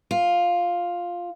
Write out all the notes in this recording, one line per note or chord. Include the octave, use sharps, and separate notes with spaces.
F4